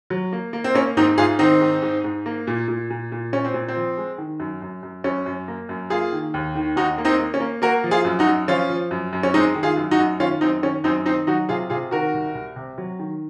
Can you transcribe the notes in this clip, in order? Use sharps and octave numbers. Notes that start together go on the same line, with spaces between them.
F#3
A#3
A#3
C4
A#3 C#4
G#2 C4 D#4
G#2 F4 G#4
D#3 C4 D#4
G#2
G#2
G#2
A#3
A#2
A#2
A#2
A#2
A#2 C#4
C4
A#2
C4
F3
G#3
D#3
F#2
F#2
F#2
F#2 C#4
F#2
A#3
F#2
A#3 F4 G#4
D#3
D#2
D#3
D#2 D#4 F#4
A#3
C4 D#4
A#3
C#4
A#3
A#3 F#4 A#4
F3
F4 G#4
F#2
D#4 F#4
F#2
F3 C#4 F4
F3
F#2
F#2
C#4
G#3 C4 D#4
D#3
F4 G#4
F#2
D#4 F#4
F#2
D#3 C#4 F4
F#2 C4 D#4
D#3 C#4
F#2 C4 D#4
D#3 C4 D#4
F#3 D#4 F#4
C3 F4 G#4
C3 F4 G#4
D#3 F#4 A#4
C2
C2
C3
F#3
D#3